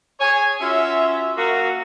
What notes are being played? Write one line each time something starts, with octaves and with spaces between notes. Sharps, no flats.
G#4 C#5 G#5
C#4 F4 F#4 E5
F#3 A#3 F#4